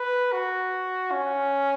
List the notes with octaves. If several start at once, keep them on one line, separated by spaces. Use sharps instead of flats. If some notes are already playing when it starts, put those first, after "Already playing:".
Already playing: B4
F#4
C#4